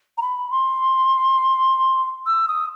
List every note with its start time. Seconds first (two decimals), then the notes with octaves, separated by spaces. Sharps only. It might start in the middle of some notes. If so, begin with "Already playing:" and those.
0.18 A#5
0.21 B5
0.51 C6
2.26 E6
2.48 D#6